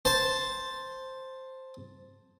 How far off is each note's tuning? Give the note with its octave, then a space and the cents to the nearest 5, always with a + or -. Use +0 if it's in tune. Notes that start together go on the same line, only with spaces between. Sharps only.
C5 +0 A5 +0